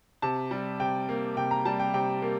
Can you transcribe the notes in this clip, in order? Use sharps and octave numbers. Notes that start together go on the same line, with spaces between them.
C3 A5
G3
C3 G5
A#3
C3 G5
A#5
G3 A5
G5
C3 G5
A#3